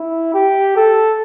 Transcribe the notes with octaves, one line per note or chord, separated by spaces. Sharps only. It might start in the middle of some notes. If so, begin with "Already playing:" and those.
Already playing: E4
G4
A4